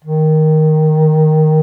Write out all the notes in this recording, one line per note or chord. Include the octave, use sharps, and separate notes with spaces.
D#3